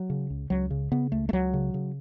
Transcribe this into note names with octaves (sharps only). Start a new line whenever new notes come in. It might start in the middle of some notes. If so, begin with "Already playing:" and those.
Already playing: F#3
C#3
C#2
C#2 F#3
C#3
C#3 B3
C#2 A3
A3
C#2 F#3
C#3
C#3